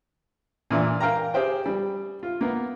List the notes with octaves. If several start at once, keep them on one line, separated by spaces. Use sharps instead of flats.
A#2 E3 D4
A#4 F5 G5 A#5
G4 G#4 C5 G5
G3
F4
A#3 B3